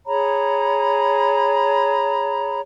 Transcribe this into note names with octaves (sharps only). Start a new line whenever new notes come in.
G#4 C#5 A#5 B5